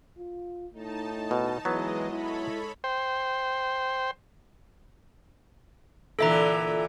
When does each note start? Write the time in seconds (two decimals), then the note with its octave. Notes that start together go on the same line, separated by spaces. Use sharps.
0.18 F4
0.73 A2 D#4 A5
1.31 B2
1.65 E3 F#3 G#3 B3 D#5
2.10 E4 A4 C#5 B5
2.84 C5 G5
6.19 A#2 D3 E3 A4 E5 A#5